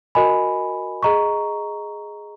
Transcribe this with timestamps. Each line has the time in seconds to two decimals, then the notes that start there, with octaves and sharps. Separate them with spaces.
0.15 F#4 A#4 D#5 G#5 B5
1.03 G#4 D#5 A#5 C#6